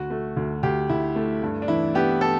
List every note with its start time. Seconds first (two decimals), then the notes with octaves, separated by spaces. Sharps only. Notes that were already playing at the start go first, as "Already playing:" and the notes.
Already playing: D2 F#4
0.10 A3
0.37 D2
0.63 D2 G4
0.89 D2 E4
1.16 A3
1.42 G2
1.62 D4
1.68 E3 E4
1.95 B3 G4
2.21 A4